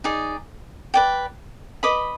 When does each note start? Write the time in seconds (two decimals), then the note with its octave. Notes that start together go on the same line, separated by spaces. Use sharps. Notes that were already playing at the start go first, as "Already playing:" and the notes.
0.04 D#4 G#4 D5
0.94 B4 D5 G5
1.83 B4 D#5 B5 D6